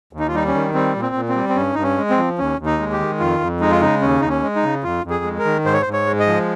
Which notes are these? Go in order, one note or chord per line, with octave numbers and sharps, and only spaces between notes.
D#2
D#4
F4
G3 D#4
C#4
D#3
G3 C4
A#2
C4
A#2
C4
G3
C4
G2 C#4
G2 D#4
C#4
G#3
C4
F3
D#2 C#4
D#2
D#4
G#3
G4
D#3
F2 F4
F2
G#3 D#4
F4
C#3 D#4
D#2 C#4
D#2 D#4
C#4
G#3
D#4
C#3
F2 F4
F2
G#4
G#3
A#4
D#3
G#2 C5
C#5
C5
G#2
C#5
G#3
D#5
F3